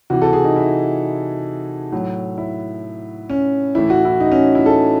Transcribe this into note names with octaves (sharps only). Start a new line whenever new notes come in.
C3 E3 F#4
A4
G#4
D#4
E4
A2 F#3
E4
C#4
A2 E3 E4
F#4
E4
D#4
C#4
E4
A4